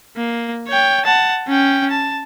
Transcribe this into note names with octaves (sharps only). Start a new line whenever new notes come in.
A#3
C#5 G5
F#5 A5
C#4 G5
A5